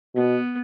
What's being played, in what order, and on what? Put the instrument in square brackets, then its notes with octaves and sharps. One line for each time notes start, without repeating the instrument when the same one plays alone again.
[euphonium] B2 [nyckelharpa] B3